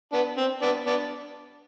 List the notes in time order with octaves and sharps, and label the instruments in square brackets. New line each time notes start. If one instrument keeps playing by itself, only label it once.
[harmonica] B3 D4
C4
B3 D4
B3 D4